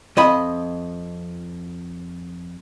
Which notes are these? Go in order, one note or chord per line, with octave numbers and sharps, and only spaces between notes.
F2 D#5 B5